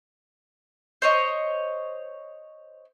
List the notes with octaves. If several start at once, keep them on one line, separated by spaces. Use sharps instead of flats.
C5 C#5 D#5